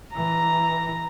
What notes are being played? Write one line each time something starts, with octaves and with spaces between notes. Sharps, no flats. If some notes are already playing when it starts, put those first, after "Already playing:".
E3 A#5